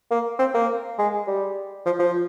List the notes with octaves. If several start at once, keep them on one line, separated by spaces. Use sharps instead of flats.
A#3
C4
A#3
G#3
G3
F3
F3